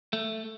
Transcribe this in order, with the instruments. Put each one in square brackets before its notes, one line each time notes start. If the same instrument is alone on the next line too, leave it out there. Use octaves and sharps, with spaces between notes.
[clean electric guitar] A3